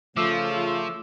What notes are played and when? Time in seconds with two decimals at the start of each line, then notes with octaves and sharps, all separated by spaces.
0.17 C#3 F3 A3 F4 D6 E6 E7